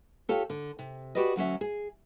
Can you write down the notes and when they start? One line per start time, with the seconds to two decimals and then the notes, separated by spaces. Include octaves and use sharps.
0.29 F4 G4 A4 C#5
0.50 D3
0.79 C3
1.15 F#4 G4 B4 D5 D#5
1.36 D2 F#3 C#4 E5
1.61 G#4